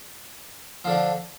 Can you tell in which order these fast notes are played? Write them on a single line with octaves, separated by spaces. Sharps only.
F3 D3 D4